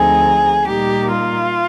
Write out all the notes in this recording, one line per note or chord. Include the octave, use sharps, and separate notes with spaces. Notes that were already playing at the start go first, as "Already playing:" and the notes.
Already playing: D2 D3 F3 C4 D#4 G#4
A#2 G3 A#3 D#4 G4
F4